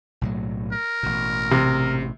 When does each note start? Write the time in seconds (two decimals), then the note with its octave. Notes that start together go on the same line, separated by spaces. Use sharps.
0.21 B1 A2 F#3
0.73 A#4
1.03 A1 B2
1.51 C3